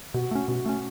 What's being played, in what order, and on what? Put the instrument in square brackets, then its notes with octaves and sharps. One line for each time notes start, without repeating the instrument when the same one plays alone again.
[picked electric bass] B2 [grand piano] F#4
[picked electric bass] A3 C#4
[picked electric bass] B2 [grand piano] F#4
[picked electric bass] A3 C#4